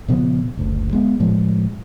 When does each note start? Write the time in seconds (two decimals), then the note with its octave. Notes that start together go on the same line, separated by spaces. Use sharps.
0.08 A#2 C#3 F3 B3
0.57 F#1 D2
0.93 G#3 B3
1.20 A2 F3 G#3